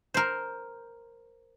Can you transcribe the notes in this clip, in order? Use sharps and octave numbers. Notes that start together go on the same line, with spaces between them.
A#4 C5